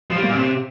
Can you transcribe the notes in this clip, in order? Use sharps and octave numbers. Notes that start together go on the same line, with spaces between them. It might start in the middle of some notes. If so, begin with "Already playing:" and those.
F3
G3
A#3
A#2
C3